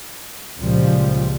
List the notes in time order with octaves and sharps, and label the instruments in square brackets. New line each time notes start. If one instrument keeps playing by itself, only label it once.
[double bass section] C#2 A#2 F3 G3